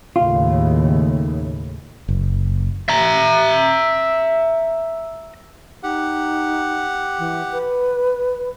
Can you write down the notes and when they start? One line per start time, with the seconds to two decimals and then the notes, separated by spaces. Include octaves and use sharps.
0.16 D#2 A2 C#3 F4
2.09 F#1
2.89 E5 A#5
5.83 D#4 G4 F#5
7.19 E3
7.52 B4